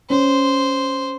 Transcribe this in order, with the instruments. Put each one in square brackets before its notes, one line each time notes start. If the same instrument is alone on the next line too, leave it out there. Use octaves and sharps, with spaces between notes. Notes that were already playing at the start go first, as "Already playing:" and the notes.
[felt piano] C#4 [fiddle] C5